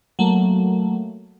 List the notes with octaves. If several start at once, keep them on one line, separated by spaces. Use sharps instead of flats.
F#3 A3 A#3